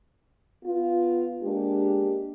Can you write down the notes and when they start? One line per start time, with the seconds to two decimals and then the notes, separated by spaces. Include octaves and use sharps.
0.65 B3 F4
1.42 G#3 A#3 D4 G4